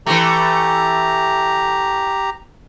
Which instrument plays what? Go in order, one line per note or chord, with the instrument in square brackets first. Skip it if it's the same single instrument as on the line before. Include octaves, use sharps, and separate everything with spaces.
[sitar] E3 A3 [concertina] G4 A#5